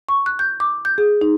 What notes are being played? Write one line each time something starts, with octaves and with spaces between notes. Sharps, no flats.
C#6
F#6
G6
D6
G6
G#4
D#4